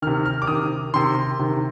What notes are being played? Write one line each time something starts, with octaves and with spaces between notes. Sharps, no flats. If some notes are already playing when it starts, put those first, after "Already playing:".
C3 D#3 F6
F6
D6
C3 D#3 D#6
C3 D#3 C6
C3 D#3